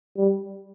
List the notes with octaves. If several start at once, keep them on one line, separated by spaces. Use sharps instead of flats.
G3